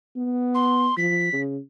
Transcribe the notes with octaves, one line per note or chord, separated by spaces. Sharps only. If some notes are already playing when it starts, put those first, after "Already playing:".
B3
C6
F3 B6
C#3